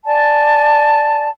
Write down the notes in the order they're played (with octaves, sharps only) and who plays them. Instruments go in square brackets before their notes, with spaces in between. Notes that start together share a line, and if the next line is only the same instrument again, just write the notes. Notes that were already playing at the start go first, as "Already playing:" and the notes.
[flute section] D5 G#5 A5